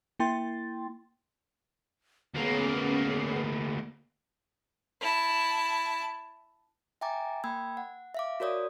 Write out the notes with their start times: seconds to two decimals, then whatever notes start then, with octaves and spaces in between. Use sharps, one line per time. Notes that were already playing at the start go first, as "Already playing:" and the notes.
0.19 A#3 E4 G5 C6 A6
2.35 D2 A#3 B3 C#4 G#4 C7
5.01 E4 A5
7.01 E5 G5 G#5 A#5 D6 A6
7.44 A#3 G5 B5 E6 G#6
7.77 F#5
8.15 E5 F5 D6
8.40 F#4 A#4 C#5 D5 D#6